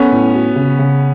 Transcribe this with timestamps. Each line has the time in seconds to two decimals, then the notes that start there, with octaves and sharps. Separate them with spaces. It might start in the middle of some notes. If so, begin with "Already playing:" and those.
Already playing: B3 C#4 A4
0.12 A2
0.35 F#4
0.56 C#3
0.79 C#3